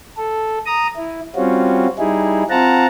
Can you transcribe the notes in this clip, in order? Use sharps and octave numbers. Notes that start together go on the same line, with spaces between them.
A4
A#5 D#6
E4
G3 C4 C#4 F4 F#4
G3 D#4 E4 G#4
C4 F4 F#5 A5 A#5